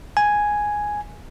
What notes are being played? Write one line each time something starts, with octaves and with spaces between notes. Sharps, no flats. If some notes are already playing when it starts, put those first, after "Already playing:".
G#5